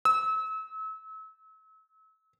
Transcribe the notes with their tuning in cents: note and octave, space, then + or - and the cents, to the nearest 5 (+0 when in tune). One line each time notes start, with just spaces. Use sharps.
E6 -35